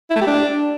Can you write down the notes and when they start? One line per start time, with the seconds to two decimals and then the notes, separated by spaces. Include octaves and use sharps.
0.10 E4
0.16 A3
0.21 G4
0.27 D4